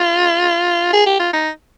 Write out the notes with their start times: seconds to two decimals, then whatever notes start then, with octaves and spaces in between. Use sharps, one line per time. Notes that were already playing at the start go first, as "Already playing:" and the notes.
Already playing: F4
0.93 G#4
1.06 G4
1.19 F4
1.33 D#4